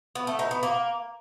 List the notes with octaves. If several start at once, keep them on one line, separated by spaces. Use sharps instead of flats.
B3
A3
D#4
B3
A#3